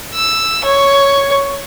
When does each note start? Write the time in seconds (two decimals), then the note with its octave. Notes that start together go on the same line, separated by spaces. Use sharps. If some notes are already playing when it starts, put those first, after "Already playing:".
0.14 E6
0.64 C#5